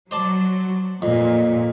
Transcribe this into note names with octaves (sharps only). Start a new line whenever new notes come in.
F#3 C5 D5 A5
F2 A#2